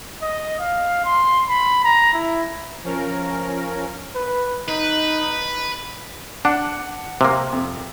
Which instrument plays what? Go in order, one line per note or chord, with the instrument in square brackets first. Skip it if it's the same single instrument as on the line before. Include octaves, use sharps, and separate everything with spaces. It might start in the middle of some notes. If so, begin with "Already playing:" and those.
[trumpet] D#5
F5
C6
B5
A#5
E4
[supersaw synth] F3 C#4 A#4
[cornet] B4
[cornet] D#4 [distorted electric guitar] B4
[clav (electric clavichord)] D4 [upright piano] F#5
[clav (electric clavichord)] C3 A#3
[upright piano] F2